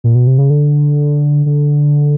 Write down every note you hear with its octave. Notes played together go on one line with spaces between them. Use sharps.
A#2
B2
C3
C#3
D3
D3